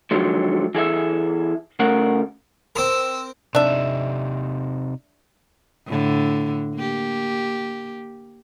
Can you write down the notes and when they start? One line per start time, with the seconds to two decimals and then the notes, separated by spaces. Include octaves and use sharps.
0.11 D3 D#3 F3 F#3 G#3
0.75 E3 G#4 A4 E5
1.79 C#3 A3 A#4 F#5
2.76 C4 A#4 E6
3.55 C3 D4 D#4 E5
5.87 A2 D3
6.75 A#3 G4